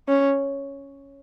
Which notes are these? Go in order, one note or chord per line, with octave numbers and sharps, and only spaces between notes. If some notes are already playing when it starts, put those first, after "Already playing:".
C#4